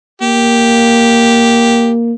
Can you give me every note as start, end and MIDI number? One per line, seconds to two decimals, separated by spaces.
0.22 2.14 58
0.22 1.92 67